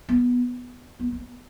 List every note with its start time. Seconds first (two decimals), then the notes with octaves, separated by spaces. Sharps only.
0.09 B3
1.00 B3
1.12 A#3